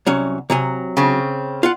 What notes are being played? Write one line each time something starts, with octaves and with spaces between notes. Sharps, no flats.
C2 F#3 C#4
C3 F#3 G#5
C#3 C4
F4 F5 F#5